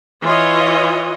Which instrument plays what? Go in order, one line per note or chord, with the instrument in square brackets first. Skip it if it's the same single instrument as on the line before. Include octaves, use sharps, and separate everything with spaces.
[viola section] E3 F4 C#5 D#5